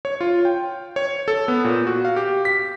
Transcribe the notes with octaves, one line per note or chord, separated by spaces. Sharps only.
C#5
F4
G5
C#5
A4
B3
A#2
F#4
F5
G4
B6